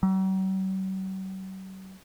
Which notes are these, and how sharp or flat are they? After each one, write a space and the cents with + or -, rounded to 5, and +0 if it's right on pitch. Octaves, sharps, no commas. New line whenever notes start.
F#3 +45